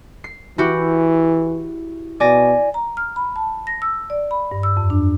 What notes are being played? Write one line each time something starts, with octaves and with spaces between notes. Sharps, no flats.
C7
E3 E4 F#4 G4
B2 D5 G#5 A#6
A#5
F6
B5
A5
A#6
E6
D5
B5
G2
E6
F2
D4